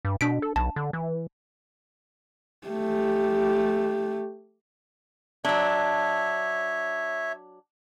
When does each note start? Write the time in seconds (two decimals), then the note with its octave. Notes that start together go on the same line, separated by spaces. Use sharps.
0.05 G2
0.21 B2 D4 B6 D7
0.42 A4
0.56 B1 A5
0.76 D3
0.93 E3
2.67 A3 G4
5.45 F#3 D4 C#5 E5